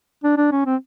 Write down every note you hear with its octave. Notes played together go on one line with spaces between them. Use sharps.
D4
D4
C#4
C4